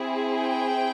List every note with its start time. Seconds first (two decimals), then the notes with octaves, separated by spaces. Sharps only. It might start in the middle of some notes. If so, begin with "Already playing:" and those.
Already playing: C4 E4 G#4
0.39 G5